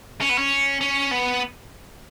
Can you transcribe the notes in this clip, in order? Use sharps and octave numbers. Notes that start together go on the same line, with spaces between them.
C#4
B3
C#4
C#4
B3